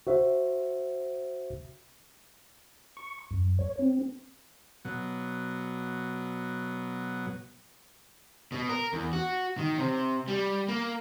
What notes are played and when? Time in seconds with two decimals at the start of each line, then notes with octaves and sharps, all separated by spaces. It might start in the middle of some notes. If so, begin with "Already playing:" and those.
0.07 F#4 C5 E5
2.97 C#6
3.31 F#2
3.59 C#5
3.79 C4
4.85 B2 F#3
8.52 B2
8.69 A#4
8.93 E2
9.13 F#4
9.58 D#3
9.78 C3
10.28 G3
10.68 A#3